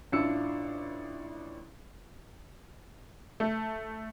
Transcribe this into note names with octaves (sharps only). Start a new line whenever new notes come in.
A1 D4 E4 F4 E6 C#7
A3